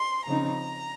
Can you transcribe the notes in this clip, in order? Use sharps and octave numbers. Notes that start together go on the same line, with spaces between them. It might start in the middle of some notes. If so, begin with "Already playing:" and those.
Already playing: C6
C#3 F3 C4 D#4 A#5